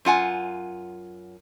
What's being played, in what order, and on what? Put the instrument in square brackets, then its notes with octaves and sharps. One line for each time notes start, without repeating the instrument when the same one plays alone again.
[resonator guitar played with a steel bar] F#2 F4 F#5 G#5